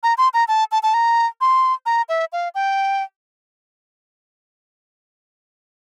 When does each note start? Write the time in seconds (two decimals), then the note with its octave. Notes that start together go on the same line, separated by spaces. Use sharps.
0.03 A#5
0.18 C6
0.34 A#5
0.48 A5
0.72 A5
0.83 A5
0.94 A#5
1.41 C6
1.86 A#5
2.09 E5
2.33 F5
2.55 G5